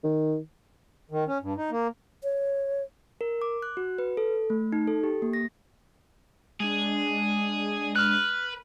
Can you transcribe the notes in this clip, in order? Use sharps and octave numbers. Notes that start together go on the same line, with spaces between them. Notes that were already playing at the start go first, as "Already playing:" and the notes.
D#3
D#3
C#4
G2
D#4
A#3
C#5
A#4
D6
F#6
F#4
B4
A4
A3
D#4
A4
G4
A#3
A#6
G#3 D4 G#4
B4 F6 F#6